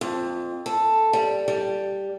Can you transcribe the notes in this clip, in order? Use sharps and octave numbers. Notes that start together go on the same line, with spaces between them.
F2
A4
G3
G3